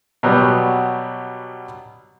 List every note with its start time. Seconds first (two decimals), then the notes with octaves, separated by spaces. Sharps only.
0.23 B2 F#3 G3 B3